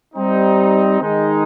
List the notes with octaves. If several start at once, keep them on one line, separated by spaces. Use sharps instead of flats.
G3 C4 D#4
D#3 G#3 D#4